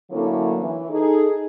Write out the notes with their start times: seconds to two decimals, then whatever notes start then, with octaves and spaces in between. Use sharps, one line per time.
0.11 D3 F#3 A3 A#3 C#4 E4
0.59 E3
0.89 D#4 G#4 A4